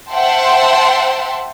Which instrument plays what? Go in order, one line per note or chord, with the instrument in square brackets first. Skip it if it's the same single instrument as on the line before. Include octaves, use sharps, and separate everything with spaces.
[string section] C5 E5 F#5 G5 A5 C6